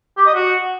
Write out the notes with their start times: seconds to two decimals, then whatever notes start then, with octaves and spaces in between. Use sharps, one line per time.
0.18 G4
0.26 D#5
0.35 F#4